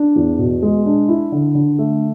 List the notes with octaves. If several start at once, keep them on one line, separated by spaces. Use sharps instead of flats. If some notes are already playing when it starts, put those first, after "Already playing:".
Already playing: D4
E2
B2
G#3
D4
E4
D3
D3
A3